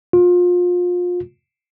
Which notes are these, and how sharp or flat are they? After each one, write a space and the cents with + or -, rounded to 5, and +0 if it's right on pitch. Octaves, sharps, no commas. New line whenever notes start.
F4 +30